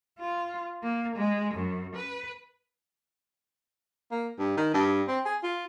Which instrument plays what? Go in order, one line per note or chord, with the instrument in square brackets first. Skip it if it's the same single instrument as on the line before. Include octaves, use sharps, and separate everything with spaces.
[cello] F4
A#3
G#3
F#2
B4
[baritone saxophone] A#3
G2
D#3
G2
C4
G#4
F4